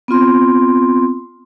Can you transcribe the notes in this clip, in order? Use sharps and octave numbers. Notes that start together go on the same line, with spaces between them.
B3 C4 F4 C6